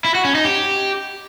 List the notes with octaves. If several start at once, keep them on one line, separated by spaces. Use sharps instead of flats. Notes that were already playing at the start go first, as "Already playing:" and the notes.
E4
F#4
C#4
D#4
G4